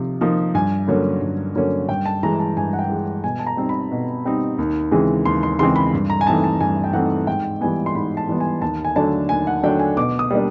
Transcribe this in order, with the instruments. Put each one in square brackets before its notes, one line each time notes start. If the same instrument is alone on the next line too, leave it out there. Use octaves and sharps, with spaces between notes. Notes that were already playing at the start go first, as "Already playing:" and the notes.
Already playing: [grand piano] C3 F3 D#4
F3 A#3 D#4
G2 G#5
D3 F#3 A#3 C#4
G2
D3 F#3 A#3 C#4
G2 G5
A5
E3 G#3 A#5
A5
G2 G#5
F#5
G5
E3 G#3
B2 G#5
A5
A#5
G3 C4 D#4
B5
B2
G3 C4 D#4
D#2
C#3 E3 G#3 C4
D#2 C6
C6
C#3 E3 G#3 C4 C6
B5
G2
A#5
G#5
E3 A3 C4 D#4 A5
A5
G2 G#5
G5
E3 A3 C4 D#4 F#5
G#2 G5
E3 G3 B3 G#5
C6
G#2 B5
A5
E3 G3 B3
G#5
D#2 A5
G#5
D3 F#3 A3 D4 A5
D#2 G#5
F#5
D3 F#3 A3 D4 G5
G#5
B2 D6
D#6
G3 A#3 D4